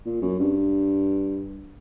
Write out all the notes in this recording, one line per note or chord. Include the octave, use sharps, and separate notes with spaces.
A#2
F#2
G2